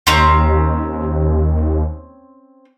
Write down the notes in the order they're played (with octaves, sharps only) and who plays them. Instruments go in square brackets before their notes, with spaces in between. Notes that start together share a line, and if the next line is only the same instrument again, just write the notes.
[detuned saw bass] D#2 [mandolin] C4 C#4 A#5